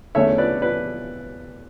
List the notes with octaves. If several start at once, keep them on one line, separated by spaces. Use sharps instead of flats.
E2 D3 A3 C#4 C#5 E5
B4 D5
B4 D5